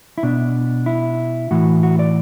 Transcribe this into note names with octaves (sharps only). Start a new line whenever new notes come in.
E4
B2 D4
E4
A2 E3 F#4
F#4
D5